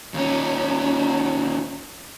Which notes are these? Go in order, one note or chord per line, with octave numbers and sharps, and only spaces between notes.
D#2 C#4